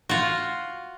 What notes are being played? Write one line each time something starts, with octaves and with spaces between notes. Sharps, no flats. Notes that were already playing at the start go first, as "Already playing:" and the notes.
F4 F#4